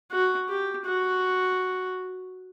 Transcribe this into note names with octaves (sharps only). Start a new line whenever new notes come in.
F#4
G4
F#4